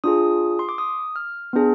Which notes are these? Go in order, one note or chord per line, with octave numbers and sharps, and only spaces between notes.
D4 F4 G#4 D#6
C6
D6
D#6
F6
B3 D4 G#4